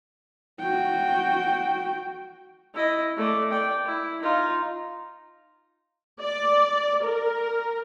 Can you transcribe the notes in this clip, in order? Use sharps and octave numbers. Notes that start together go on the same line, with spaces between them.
F#4 G5
E4 D#5
A3 D5
D5 G5
E4
D#4 F4
D5
A#4